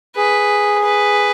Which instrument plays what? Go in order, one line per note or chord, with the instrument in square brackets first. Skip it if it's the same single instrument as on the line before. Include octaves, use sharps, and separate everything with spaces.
[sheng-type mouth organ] G#4 [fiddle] B4
[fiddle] B4